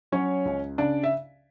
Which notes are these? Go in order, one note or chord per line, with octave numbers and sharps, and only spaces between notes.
F#3 C#4 C#5
C#2
C#3 D4 D5
E5